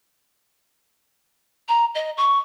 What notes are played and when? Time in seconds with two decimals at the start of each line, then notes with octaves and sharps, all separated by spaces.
1.69 A#5
1.95 D#5
2.17 C#6